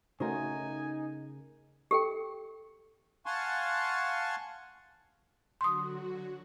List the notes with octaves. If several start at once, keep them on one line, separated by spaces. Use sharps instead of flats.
C#3 A3 D#4 F#4 A#4 C5 G#5
G4 A4 G5
F5 F#5 G#5 A5 C6 C#6
D3 F#3 F#4 C6 D#6